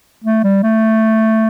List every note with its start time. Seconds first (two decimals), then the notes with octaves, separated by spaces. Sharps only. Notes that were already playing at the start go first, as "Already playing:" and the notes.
0.24 A3
0.44 G3
0.63 A3